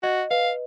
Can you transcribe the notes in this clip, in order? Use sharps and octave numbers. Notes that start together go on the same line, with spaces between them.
F#4 D#5
B4 F5